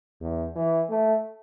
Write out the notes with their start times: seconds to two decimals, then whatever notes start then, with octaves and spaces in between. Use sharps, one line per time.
0.21 E2
0.56 E3
0.90 A3